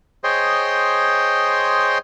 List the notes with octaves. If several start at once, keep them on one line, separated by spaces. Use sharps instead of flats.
G#4 C5 C#5 D#5 G5 C6